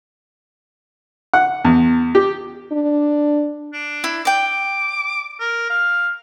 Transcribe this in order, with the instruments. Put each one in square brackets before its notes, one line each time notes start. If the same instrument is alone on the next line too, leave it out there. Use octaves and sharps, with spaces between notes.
[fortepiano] F#5
E2
G4
[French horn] D4
[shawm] D4
[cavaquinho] E4
[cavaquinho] D5 G5 [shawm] D6
[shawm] A#4
F5